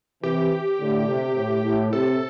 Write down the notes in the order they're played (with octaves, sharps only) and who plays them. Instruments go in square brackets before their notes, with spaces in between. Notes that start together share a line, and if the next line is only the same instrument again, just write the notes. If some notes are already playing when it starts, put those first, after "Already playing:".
[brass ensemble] C3 E3 [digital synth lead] G4
[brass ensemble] A2 D3
C3
A2
A2
[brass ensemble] C3 [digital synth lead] A4